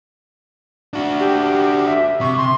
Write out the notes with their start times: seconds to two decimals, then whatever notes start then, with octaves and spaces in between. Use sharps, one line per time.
0.94 D4 F#4
1.20 G4
1.87 E5
2.21 C3 C#6
2.37 C6